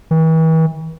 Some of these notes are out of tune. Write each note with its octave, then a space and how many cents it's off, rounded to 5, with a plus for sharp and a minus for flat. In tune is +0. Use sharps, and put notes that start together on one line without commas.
E3 -40